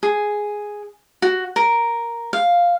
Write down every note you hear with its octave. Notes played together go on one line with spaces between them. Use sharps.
G#4
F#4
A#4
F5